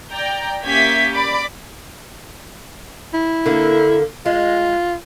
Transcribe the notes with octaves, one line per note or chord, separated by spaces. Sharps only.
D5 G5 A#5
A#3 C#4 G4 E5 G#6 B6
D5 B5 D6
E4
D3 A#3
G#3 F4